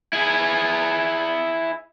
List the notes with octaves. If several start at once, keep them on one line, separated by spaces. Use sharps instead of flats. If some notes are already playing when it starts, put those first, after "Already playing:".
E4 G#4